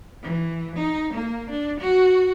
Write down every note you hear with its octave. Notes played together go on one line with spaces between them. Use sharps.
E3
D#4
A#3
D4
F#4